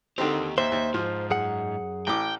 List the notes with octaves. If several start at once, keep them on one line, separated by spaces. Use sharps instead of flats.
D#2 D3 D#3 C4 G4
D#2 C5 E5
D#2
G#2 F3
F#2 G#4 F#5
A1 E3 G5 D6